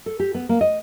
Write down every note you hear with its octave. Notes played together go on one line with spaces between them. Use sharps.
A4
G4
B3
A#3
D#5